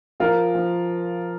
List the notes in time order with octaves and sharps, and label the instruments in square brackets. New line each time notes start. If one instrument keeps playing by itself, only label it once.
[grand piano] F3 [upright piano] F4 A#4
[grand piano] F3